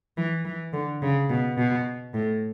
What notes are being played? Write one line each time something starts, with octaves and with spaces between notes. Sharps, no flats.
E3
E3
D3
C#3
B2
B2
A2